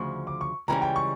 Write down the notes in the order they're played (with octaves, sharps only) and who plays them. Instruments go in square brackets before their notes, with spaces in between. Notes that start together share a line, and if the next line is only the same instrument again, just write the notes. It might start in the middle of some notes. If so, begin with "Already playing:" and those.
Already playing: [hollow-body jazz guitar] D2 C#3 F3 [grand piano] C#6
[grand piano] D6
C#6
[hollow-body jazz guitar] C#2 C#3 E3 G3 C#4 [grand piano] A#5
[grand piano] G5
C#6